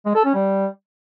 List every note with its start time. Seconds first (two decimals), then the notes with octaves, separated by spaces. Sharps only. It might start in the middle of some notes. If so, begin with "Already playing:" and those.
0.06 G#3
0.15 A4
0.25 C#4
0.34 G3